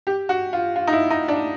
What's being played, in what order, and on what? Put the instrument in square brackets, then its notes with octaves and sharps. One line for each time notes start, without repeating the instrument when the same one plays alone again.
[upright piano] G4
F#4
F4
F4
D#4
E4
D#4
D4